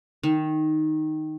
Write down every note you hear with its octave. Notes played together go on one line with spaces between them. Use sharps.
D#3